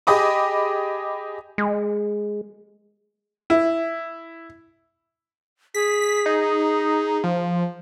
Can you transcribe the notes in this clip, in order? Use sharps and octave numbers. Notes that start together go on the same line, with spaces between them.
G4 G#4 D#5 B5 D6 D#6
G#3
E4
G#4 B6
B6
D#4
F3